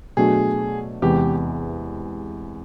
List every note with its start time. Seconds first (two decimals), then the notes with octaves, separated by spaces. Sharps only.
0.17 B2 F#3 A3 D4 F#4 G#4
1.02 E2 C3 E3 G#3 G4